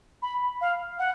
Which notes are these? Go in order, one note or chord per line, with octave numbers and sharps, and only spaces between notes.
B5
F5
F#5